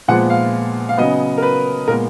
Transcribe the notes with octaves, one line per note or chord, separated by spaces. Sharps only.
A#2 F3 G#3 B3 F#5
F5
F5
C#3 F#3 B3 D#5
A#4
B4
A#2 G#3 B3 A#4